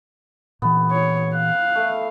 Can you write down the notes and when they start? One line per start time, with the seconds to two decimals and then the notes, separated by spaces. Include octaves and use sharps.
0.62 A#2 E3 B3
0.91 C#5
1.35 F5 F#6
1.75 A3